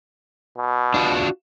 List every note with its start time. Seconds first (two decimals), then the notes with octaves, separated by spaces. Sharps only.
0.58 B2
0.94 D4 F4 F#4